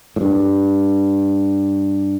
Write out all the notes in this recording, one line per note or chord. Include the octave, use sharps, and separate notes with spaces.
A2
G2